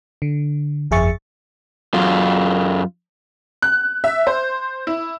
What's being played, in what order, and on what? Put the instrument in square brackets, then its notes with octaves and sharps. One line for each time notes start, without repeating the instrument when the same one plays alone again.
[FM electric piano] D3
G1 F2 G#4 E5 C#6 A6
[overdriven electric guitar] F#2 F4
[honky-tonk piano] F#6
E5
C5
E4